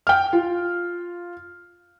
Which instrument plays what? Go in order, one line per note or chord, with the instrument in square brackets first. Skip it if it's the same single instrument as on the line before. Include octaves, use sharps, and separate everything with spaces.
[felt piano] G5 F6
F4